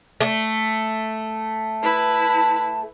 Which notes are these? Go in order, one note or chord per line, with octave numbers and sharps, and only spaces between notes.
A3
E4 B4 A5